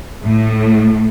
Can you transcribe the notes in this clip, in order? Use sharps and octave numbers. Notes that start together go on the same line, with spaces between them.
A2